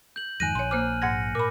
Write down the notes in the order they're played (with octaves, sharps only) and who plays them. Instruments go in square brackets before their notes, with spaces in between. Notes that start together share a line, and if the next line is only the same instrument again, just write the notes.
[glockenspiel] G6 F#7
[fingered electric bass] F2 G#2 D#3 [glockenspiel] G#5 F#6 D#7 [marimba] A#6
[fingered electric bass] A#1 [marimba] C#5 C6
[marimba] A#3 C5 D6 [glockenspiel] F6 F#6
[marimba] G#2 F#5 G#6 [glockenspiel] A#6 C#7
[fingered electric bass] A#2 [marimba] A#4 B5 [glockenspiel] D6